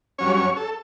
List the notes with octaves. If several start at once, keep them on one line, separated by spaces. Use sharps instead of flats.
G2 F#3 C#4 C#5
C#5
A4